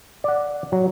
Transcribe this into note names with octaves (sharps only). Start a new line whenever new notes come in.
D5 F#5
F#3